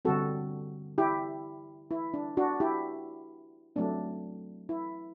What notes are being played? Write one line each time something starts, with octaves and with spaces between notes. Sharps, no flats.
D3 G3 C4 F#4 A4
E4 G4
E4
D4
D4 F#4
E4 G4
F#3 A3 C4 D4
E4